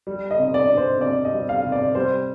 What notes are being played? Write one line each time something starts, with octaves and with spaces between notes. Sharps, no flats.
G3
D#5
C3
D5
D4
C5
C3 D5
D#5
G3
F5
C3
D5
G3 C5